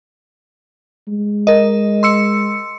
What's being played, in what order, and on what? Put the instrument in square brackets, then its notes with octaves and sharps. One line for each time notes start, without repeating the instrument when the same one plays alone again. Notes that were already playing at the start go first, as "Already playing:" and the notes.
[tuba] G#3
[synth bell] A#4 D#5
C6 E6 C#7